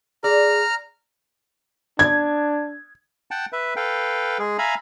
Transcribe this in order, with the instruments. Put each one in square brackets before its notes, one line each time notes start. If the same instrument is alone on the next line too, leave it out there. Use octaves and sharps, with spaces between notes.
[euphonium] G#4 [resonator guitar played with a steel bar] D5 [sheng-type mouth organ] A#5 F6
[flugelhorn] D4 [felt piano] G#6
[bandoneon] F#5 G5 A5
B4 E5
A4 B4 F5 G5
G#3 G#4
E5 F5 G#5 A#5 B5